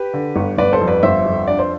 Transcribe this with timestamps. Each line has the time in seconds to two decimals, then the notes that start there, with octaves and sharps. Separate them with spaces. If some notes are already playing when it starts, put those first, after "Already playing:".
Already playing: G4 B4
0.14 D3
0.36 G1
0.58 G1 B4 D5
0.73 A4 C5
0.81 F2
0.88 B4 D5
1.03 G1 C5 E5
1.26 F2
1.48 D4 D5
1.59 C5